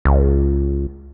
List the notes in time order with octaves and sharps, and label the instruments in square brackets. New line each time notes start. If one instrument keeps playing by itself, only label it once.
[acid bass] C#2